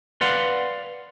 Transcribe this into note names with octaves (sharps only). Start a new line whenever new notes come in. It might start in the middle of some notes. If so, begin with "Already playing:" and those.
B4 D5 F5 F#5 C6